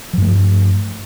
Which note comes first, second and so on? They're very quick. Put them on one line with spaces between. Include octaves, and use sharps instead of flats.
F3 G2 A3